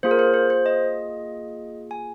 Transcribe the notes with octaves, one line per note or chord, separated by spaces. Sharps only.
A#3 F4 G#4 C5
A#4
C5
C5
C5
D#5
G#5